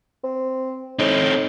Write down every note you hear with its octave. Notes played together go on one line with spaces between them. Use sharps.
C4
A2 C4 D#4